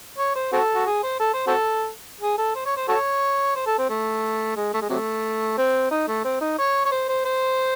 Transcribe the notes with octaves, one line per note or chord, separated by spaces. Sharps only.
C#5
C5
C4 F#4 A4
F#4
G#4
C5
A4
C5
C4 F#4 A4
G#4
A4
C5
C#5
C5
F#4 A4 C#5
C5
A4
C4
A3
G#3
A3
G#3
C3 F#3 A3
C4
D#4
A3
C4
D#4
C#5
C#5
C5
C5
C5